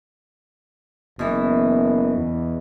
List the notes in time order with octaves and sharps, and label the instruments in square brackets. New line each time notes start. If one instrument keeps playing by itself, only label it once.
[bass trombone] F#1 [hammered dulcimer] B2 E3
[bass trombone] E2